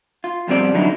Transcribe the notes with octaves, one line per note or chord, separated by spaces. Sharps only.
F4
F2 B2 G3 C4 D5
D3 E3 F#3 C#4 D#4 E4